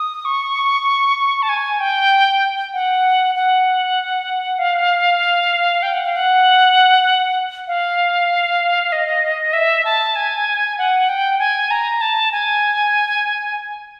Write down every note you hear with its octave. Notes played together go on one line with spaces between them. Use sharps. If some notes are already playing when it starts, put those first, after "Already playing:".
Already playing: D#6
C#6
A5
G#5
G5
F#5
F#5
F5
G5
F#5
F5
F#5
F5
D#5
E5
A5
G#5
F#5
G5
G#5
A#5
A5
G#5